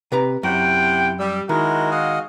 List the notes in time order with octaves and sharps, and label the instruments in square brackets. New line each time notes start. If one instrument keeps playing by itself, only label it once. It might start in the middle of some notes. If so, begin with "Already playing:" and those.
[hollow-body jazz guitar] C3 B4 A#5
[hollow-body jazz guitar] F#2 [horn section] C3 F#5 G5 [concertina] E4
[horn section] G3 [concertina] E6
[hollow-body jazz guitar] D#3 [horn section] G#3 D#4 F#4 [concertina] E4 A#4
[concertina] D#5 F5 F#5